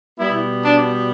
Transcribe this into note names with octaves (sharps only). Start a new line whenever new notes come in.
B2 G3 B3 E4
D4